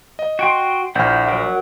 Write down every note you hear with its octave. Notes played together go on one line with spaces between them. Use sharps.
D#5
F#4 G5 C6
A#1 E4 F#5 F6 G6
F#3 A#4 F#5